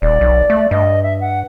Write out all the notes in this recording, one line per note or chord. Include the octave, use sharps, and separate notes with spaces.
D#1 D5
B1
A3
G2 D#5
E5
F#5